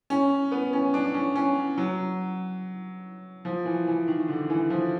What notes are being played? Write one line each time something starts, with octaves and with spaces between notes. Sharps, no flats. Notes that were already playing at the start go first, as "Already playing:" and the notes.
C#4
B3
C#4
D4
C#4
C#4
F#3
F3
E3
E3
D#3
D3
E3
F3